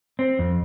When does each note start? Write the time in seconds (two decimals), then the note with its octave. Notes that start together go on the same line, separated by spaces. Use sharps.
0.19 C4
0.39 F2